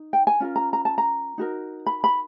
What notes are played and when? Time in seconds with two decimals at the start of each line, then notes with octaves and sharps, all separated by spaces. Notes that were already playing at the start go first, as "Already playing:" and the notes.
Already playing: D#4
0.13 G5
0.27 G#5
0.40 C#4 F4 A#4
0.56 A#5
0.73 A#5
0.85 A5
0.98 A#5
1.38 D#4 F#4 A#4
1.87 B5
2.04 B5